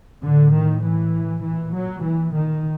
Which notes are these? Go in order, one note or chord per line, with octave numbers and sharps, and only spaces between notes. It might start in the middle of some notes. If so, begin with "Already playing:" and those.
A2 D3
D#3
E3
A#2 E3
F#3
E3
D#3